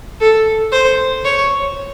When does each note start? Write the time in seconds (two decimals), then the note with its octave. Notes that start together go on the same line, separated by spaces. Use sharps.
0.21 A4
0.72 C5
1.25 C#5